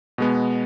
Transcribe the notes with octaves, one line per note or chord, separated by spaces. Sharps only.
B2 G#3 B3